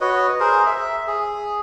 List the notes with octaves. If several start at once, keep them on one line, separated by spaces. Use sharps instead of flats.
F#4 B4 C#5 D#5
G#4 A#4 C5
E5
G#4